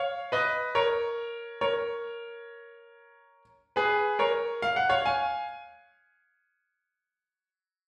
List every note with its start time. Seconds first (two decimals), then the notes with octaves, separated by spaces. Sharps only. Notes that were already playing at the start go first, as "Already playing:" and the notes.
Already playing: C#5 F5
0.32 B4 D#5
0.75 A#4 C#5
1.61 A#4 C#5
3.76 G#4 B4
4.19 A#4 C#5
4.62 F5
4.76 F#5
4.90 C#5 F5
5.05 F5 G#5